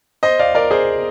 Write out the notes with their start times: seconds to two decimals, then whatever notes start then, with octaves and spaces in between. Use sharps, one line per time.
0.23 C5 D#5
0.39 D5 F5
0.55 A#4 D5
0.71 G#4 C5